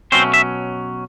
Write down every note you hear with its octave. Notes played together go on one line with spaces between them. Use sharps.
B2 F#3 A3 C4 C#4 C5
E5